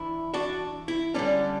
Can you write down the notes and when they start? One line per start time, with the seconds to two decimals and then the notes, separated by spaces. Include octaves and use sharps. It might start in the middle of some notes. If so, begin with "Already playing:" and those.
Already playing: E3 D4 E4
0.34 D4 F#4
0.88 E4
1.14 D3 G3 C#4 D4